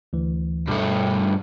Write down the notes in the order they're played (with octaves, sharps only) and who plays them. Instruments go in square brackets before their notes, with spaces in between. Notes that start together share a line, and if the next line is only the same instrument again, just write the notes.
[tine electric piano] D2 E3
[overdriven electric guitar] G2 A3 [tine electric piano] B2